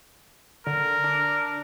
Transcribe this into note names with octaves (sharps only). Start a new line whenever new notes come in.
D3 A#4
D4